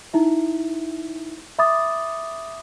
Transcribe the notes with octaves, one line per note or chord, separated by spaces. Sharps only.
D#4 E4 E5
E5 B5 D6 D#6 A6